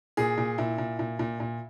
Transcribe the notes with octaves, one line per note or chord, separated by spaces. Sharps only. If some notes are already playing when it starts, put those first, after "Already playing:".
A#2 G#4
A#2
A#2 E4
A#2
A#2
A#2
A#2